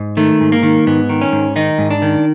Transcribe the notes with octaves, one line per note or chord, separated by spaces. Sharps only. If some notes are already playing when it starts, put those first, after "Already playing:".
Already playing: G#2
D#3 A3
G#2
A#3
D#3
G#2 B3
D#3
C#4
G#2
D#3 D#4
G#2
D4
D#3